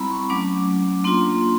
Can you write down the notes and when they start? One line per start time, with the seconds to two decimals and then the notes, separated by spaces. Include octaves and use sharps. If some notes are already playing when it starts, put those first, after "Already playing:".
Already playing: G3 C4 E4 A#5 B5
0.11 C#6
0.29 F#3 A3 C#4 D6
1.04 A#3 D4 F4 C6